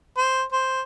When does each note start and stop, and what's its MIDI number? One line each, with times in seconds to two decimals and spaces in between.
0.17 0.43 72
0.52 0.82 72